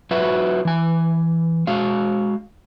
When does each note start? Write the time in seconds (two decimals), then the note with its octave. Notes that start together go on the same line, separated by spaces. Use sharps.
0.11 F#3 F4 F#4 B4 E5 F#5
0.65 E3 G#5
1.67 G#3 F#4 F5